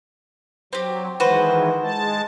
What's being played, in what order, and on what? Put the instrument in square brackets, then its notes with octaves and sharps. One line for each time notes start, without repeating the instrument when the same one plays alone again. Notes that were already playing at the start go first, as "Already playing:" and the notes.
[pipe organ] F#3 [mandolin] C4 G4
[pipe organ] D#3 E3 G#3 [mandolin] F#4 B4 C5
[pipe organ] G#3 A5